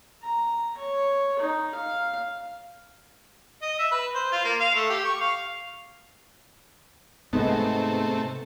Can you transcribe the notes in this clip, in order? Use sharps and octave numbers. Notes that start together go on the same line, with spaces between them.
A#5
C#5
D#4
F5
D#5
E5
B4
C5
F4
A#3
F5
A3
G4
C#6
F5
G#2 C3 G#3 A3 B3